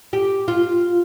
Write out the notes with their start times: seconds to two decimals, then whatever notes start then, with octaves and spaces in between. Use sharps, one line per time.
0.13 G4
0.48 F4